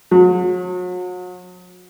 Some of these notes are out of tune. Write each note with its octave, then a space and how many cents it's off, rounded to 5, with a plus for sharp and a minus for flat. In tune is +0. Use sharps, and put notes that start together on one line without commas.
F#3 -40